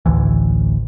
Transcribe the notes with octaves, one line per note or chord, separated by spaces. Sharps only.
A1 D2 E3